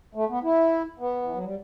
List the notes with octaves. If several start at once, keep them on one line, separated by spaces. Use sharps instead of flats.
A3
B3
E4
B3
E3
F#3
G3